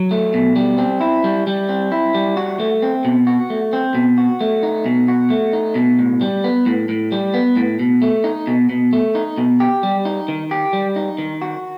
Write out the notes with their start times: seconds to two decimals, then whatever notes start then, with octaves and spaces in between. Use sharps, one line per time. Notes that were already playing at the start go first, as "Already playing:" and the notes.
Already playing: F#3
0.11 A3
0.34 B2
0.56 G3
0.78 C4
1.01 E4
1.24 G3
1.47 G3
1.69 C4
1.92 E4
2.14 G3
2.37 F#4
2.60 A3
2.82 C4
3.05 B2
3.27 F#4
3.50 A3
3.73 C4
3.95 B2
4.18 F#4
4.41 A3
4.63 D#4
4.86 B2
5.08 F#4
5.30 A3
5.53 D#4
5.75 B2
5.99 A2
6.21 G3
6.44 B3
6.66 A2
6.89 A2
7.12 G3
7.34 B3
7.57 A2
7.79 B2
8.02 A3
8.24 D#4
8.47 B2
8.69 B2
8.93 A3
9.15 D#4
9.38 B2
9.60 G4
9.83 G3
10.05 D#4
10.28 D#3
10.51 G4
10.73 G3
10.96 D#4
11.18 D#3
11.42 F#4